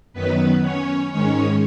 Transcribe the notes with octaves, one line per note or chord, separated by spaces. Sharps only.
F#2 D#3 F#3 B3 B4
C#4 C#5
G#2 D#3 G#3 C#4 C#5